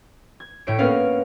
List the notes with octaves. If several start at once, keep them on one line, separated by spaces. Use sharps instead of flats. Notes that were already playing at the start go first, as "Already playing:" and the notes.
G#6
A2 A3 C#5 C#7 D7
A#3 B3 C#4 A#4 F5